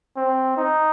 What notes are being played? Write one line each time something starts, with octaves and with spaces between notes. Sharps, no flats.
C4
D#4